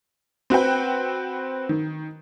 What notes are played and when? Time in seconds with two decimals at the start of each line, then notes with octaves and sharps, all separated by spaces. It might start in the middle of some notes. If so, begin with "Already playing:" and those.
0.50 C4 F#4 B4 G5
1.69 D#3